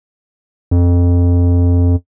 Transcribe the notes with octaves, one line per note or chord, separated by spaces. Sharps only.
F2